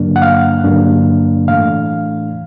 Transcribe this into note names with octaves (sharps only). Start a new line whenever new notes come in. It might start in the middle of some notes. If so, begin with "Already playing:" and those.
Already playing: G2 D3 F#3 A#3 D4
F#5
F5
G2 D3 F#3 A#3 D4
A2 E3 A3 D4 F5